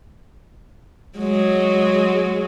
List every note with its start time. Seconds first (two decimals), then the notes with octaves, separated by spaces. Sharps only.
1.18 F#3 G#3